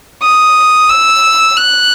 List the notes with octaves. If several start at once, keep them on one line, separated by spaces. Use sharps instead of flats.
D#6
E6
F#6